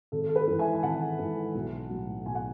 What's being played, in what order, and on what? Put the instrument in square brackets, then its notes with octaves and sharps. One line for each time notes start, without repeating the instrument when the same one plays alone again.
[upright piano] G#1 A4
A4
B4
G#2 E3
E5 G#5
G#5
G#1 F#5 A5
G#2 E3
B1
A2 F#3
B1 G#5
F#5